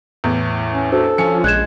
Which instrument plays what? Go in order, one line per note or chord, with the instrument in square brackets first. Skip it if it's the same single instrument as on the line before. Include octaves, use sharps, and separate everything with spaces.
[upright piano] E2 A2
[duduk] C#4
[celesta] D4 F#4 C5 [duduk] A4
[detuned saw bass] F3 [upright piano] C#4 G#5 C#7
[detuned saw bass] A#1 [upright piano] G#3 [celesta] F#6 G#6 E7